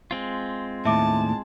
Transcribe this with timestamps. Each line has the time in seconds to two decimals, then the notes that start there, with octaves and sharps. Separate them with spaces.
0.11 G#3 C4 F4
0.85 D#2 A2 E5 A5 D6